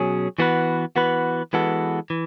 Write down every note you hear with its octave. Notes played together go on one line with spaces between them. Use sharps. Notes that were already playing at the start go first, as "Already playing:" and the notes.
Already playing: B2 F#3 C#4 G#4
E3 B3 F#4 B4
E3 B3 F#4 B4
E3 G#3 B3 F#4 A4
E3